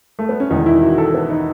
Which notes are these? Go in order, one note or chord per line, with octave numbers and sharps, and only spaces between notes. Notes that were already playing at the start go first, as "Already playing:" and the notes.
A3
B3
C#4
E1 E2 D#3 D#4
E4
F#4
A4
B3
D#4